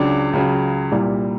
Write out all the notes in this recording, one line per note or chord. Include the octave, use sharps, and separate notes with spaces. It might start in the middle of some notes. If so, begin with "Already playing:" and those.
Already playing: C#2 C#3 F#3 D4
C#2 C#3 F#3
C2 A#2 G3